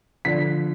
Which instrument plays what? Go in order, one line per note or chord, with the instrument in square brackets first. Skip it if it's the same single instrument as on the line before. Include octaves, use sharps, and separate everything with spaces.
[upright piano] D3 F3 B6